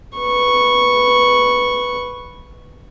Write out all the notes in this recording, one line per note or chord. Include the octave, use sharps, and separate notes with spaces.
B4 C#6